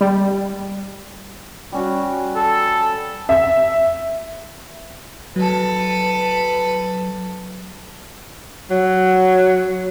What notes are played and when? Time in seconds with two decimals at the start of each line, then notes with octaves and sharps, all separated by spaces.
0.01 G3
1.72 G3 C#4 F#4
2.37 A4
3.29 E5
5.36 F#3 A4 B4
8.70 F#3